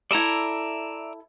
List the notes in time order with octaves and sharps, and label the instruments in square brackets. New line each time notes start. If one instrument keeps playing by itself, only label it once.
[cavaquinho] E4 A4 [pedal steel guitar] D5 E5 A#5